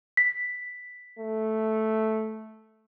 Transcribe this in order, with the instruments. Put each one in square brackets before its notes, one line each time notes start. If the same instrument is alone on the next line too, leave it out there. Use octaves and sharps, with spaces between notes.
[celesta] B6
[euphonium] A3